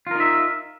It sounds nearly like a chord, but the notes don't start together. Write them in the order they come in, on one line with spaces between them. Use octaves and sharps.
F4 A#4 D#4 E5